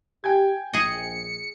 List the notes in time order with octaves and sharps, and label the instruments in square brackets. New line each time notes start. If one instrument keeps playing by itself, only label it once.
[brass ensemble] G4 [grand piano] G5 G#5 G#6
[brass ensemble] A#1 [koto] G#4 D#5 [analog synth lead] C#7